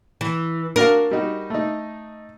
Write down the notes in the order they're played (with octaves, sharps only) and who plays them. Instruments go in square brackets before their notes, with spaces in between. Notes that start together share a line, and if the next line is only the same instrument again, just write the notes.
[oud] E3
[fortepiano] D4 F#4 F5 [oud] A#4
[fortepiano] G3 D#4 F#4
A3 D#4